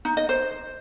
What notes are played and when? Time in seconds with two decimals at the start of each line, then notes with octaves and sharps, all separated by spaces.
0.05 D#4
0.17 D#5
0.29 C5